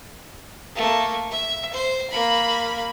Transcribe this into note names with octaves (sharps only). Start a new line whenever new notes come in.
A3 A#3
E5
C5
A#3 B5